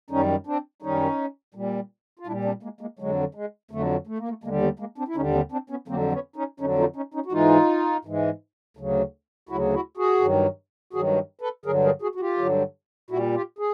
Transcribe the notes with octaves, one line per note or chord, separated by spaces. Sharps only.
F#2 D#3 G3 C#4 D#4
C4 D4
F#2 D#3 G3 C#4 D#4
A#2 G3
F4
A#2 G3 D4 E4
C4 D4
G#3 A#3
G#3 A#3
F2 D3 F#3 G#3
G#3
F2 D3 F#3 A3
A3
A#3
A3
D#2 D3 G3 G#3 A#3
A3 B3
G#3 A#3
C4 D4
E4
D#2 D3 G3 C#4 D#4
C4 D4
C4 D4
B3 C#4
F2 D3 F#3 A#3 C4
B3 C#4
C#4 D#4
F2 D3 F#3 C#4 D#4
D#4 F4
C#4 D#4
C#4 D#4
F#4
G#2 E3 G#3 D#4 F4
G#2 E3 G#3
D2 C#3 F#3
D2 C#3 F#3 E4 F#4
E4 F#4
F#4 G#4
G2 D#3 F#3
G2 D#3 F#3 F#4 G#4
A4 B4
G2 D3 F#3 G#4 A#4
G#4 A#4
F#4 G#4
F#4
F4 G4
G2 D3 F#3
A#2 G3 E4 F#4
F4 G4
G#4